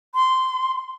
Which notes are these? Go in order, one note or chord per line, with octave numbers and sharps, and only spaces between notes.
C6